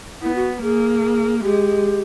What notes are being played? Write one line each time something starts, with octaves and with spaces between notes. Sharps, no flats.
B3 E4
F#4
A#3 G#4
G#4
G#3 G4